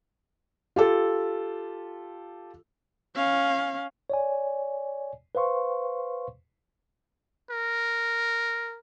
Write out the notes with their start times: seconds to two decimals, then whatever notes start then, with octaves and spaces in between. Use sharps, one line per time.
0.76 F4 G4 A4
3.16 C#4 F5
4.10 C#5 D5 G#5
5.35 B4 C5 F5 C6 C#6
7.50 A#4